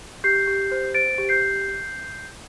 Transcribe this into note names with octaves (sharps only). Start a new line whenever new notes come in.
G4 G6 C7
G4
C5
C5 A6 D7
G4
G6 C7